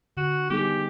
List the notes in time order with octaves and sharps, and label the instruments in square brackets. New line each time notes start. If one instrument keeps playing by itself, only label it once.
[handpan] D3 [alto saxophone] F#4
[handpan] G3 B3 D#4 G#4 [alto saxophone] G4